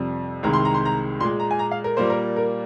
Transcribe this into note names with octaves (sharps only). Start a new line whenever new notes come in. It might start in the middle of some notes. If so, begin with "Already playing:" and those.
Already playing: F2 C3 G3
C2 C3 D#3 G#3 A#5
C6
A#5
C6
A#5
A#2 G#3 C6
A#5
G#5
A#5
F5
A#4
A#2 G3 A#3 C5
A#4
A#4